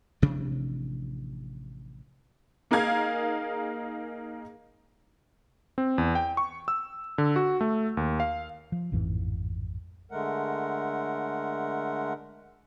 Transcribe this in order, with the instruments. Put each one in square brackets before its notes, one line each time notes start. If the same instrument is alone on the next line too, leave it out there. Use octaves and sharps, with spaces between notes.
[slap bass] A1 C3 F3 D4
[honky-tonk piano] A#3 D#4 G#4 A#4 F5 G#6
[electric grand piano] C4
E2
G5
C#6
E6
D3
F#4
A3
D#2
F5
[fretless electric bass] F3
A1 F2 G#2 E3
[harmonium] D3 G#3 A3 A#4 F#5